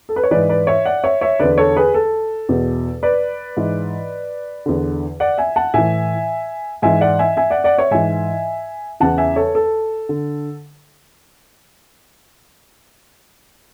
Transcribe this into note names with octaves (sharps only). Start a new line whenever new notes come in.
A4
B4
C#5
G#2 E3 B4 D5
B4 D5
C#5 E5
D5 F#5
C#5 E5
C#5 E5
E2 D3 B4 D5
A4 C#5
G#4 B4
A4
E2 B2
B4 D5
G#2 E3
E2 D3
D5 F#5
E5 G#5
F#5 A5
A2 E3 E5 G#5
G#2 E3 E5 G#5
D5 F#5
E5 G#5
E5 G#5
D5 F#5
D5 F#5
C#5 E5
G#2 E3 E5 G#5
E2 C#3 E3 F#5 A5
E5 G#5
A4 C#5
A4
D3